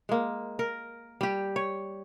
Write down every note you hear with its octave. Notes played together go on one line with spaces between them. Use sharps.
G#3 A#3
A#4
G3 G4
C#5